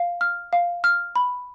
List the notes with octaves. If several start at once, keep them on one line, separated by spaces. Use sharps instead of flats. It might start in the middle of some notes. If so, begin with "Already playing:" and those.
Already playing: F5
F6
F5
F6
B5